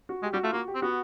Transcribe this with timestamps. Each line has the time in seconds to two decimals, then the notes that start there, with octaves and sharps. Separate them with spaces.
0.09 F#4
0.23 G#3 G4
0.33 G3 F#4
0.43 A3 F4
0.52 A#3 F#4
0.68 G4
0.75 C4
0.82 B3 F#4